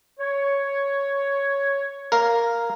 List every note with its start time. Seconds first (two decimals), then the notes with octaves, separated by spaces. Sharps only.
0.20 C#5
2.12 A#4 F5